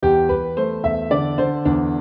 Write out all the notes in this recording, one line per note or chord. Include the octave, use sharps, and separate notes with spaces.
E2 G4
E2 B4
A3 C5
E2 E5
D3 D5
D3 C5
E2 D4